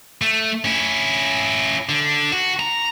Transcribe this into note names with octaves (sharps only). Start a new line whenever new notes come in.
A3
C#4 E4
D3
F#4
A#5